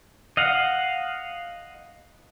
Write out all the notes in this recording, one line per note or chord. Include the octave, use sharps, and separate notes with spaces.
D#5 F5 F#5